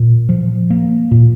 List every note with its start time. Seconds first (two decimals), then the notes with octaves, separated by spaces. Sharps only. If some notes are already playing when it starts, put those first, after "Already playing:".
Already playing: A#2
0.29 F3
0.70 A#3
1.11 A#2